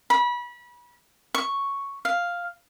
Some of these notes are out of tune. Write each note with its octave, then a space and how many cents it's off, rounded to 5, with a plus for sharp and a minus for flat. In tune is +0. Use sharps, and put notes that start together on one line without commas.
B5 -30
C#6 +0
F5 +0